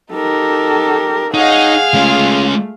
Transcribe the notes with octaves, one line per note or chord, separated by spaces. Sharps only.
D#4 G4 A4 A#4
D#4 G#4 C#5 D#5 F5 F#5
G#3 A3 C#4 F4